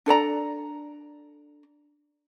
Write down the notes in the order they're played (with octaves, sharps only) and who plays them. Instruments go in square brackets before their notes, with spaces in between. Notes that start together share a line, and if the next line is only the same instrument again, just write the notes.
[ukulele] D4 A4 D5 A#5